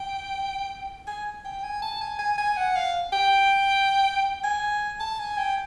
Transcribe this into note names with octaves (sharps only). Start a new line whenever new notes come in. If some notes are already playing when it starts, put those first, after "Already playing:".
Already playing: G5
G#5
G5
G#5
A5
G#5
G#5
G#5
F#5
F5
G5
G#5
A5
G#5
G5